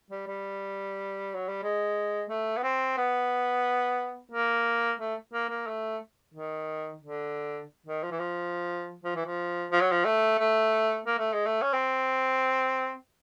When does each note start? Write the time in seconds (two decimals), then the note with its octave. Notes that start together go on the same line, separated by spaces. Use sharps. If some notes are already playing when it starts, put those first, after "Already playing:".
0.11 G3
0.27 G3
1.35 F#3
1.49 G3
1.63 G#3
2.30 A3
2.57 B3
2.63 C4
2.97 B3
4.32 A#3
5.00 A3
5.33 A#3
5.49 A#3
5.67 A3
6.34 D#3
7.02 D3
7.86 D#3
8.03 F3
8.11 E3
8.19 F3
9.04 F3
9.16 E3
9.26 F3
9.71 F3
9.81 F#3
9.92 F3
10.05 A3
10.39 A3
11.07 A#3
11.19 A3
11.33 G#3
11.46 A3
11.62 C#4
11.73 C4